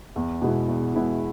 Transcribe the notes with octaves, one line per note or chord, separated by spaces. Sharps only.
E2
B2 G#3 B3 E4
E2
B2 G#3 B3 E4